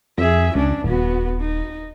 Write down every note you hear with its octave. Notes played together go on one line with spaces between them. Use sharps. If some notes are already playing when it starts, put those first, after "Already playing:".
F2 G#4 E5
C#2 C#4 D4
D#1 B3 F#4
D#4